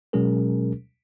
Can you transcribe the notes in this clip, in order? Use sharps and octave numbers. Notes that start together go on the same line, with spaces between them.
B2 F#3 G#3 C#4 G#4 A#4